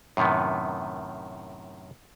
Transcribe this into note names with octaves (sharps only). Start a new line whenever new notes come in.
F#2 A2 C3 D#3 B3